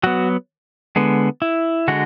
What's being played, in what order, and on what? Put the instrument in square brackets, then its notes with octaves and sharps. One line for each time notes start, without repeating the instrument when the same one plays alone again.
[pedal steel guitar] F#3 B3 F#4
D3 G#3 B3
E4
D3 G#3 F#4